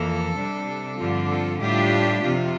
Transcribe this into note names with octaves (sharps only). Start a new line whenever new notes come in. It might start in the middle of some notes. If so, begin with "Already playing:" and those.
Already playing: F2 E3 A#3 A4
C3 G3 D4
G2 D3 F3 C4 F4 G4
A4
A2 G3 D4 F4 G4
F2 C3 F3 F4